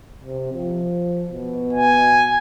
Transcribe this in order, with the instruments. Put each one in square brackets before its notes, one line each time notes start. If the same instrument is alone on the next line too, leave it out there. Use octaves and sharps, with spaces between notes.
[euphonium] C3
F3
B2
[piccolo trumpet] G#5